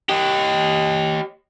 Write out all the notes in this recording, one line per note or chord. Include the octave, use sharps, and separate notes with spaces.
G4 D#5